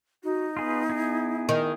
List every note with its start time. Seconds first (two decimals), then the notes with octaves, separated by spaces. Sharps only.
0.24 D#4 F#4
0.57 B3 F4 G#4 B4
0.89 E4 G#4
1.49 D#3